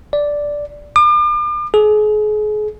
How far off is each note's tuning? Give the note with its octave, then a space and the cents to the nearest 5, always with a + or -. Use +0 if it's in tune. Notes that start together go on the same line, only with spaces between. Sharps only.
D5 -5
D6 +40
G#4 +35